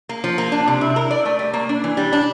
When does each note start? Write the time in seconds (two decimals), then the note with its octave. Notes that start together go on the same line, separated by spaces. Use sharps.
0.09 A#3
0.24 F3
0.38 A#3
0.52 D4
0.67 C3
0.81 E4
0.96 A#4
1.11 D5
1.25 A3
1.39 G3
1.53 A#3
1.69 D4
1.84 E3
1.97 G3
2.13 D4